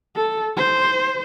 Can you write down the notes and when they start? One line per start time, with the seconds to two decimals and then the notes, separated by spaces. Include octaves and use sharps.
0.16 A4
0.57 C5